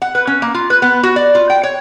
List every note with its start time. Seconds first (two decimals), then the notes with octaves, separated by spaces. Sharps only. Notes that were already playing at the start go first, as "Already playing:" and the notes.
0.02 F#5
0.15 B4
0.27 C#4
0.42 A#3
0.54 F4
0.70 B4
0.82 B3
1.03 F#4
1.16 D5
1.35 F4
1.50 G5
1.63 C#5